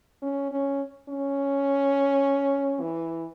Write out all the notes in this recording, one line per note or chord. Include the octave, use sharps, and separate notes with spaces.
C#4
C#4
C#4
E3